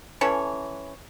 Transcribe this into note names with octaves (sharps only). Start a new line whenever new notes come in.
E3 C#4 A4 C#5